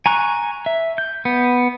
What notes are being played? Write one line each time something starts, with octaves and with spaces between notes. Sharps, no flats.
G#5 A#5 C#6 F#6
E5
G6
B3